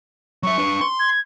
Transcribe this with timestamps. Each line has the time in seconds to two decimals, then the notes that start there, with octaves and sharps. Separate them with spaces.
0.43 F#3 E5 C#6
0.58 D4 B4
0.81 C6
1.00 G#6